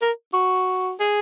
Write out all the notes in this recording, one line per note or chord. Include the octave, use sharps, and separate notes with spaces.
A#4
F#4
G#4